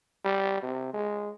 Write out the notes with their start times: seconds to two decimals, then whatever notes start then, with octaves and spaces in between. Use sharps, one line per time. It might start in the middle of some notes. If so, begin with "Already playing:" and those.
0.24 G3
0.63 C3
0.93 G#3